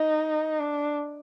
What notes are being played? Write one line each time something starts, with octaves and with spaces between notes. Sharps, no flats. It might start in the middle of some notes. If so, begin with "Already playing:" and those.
Already playing: D#4
D4